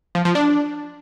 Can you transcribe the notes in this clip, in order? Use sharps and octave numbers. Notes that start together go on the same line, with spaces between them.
F3
F3
D4